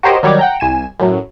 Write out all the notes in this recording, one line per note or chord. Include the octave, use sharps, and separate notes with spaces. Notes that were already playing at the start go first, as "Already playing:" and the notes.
F#4 G4 A#4 C5 C#5 D#5
D#3 F#3 G3 C#5 D5 D6
F#5 G5 A#5
C2 G#5 E7
F#2 A2 F#3